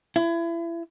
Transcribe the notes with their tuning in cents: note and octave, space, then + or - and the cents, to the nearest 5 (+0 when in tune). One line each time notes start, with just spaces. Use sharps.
E4 +30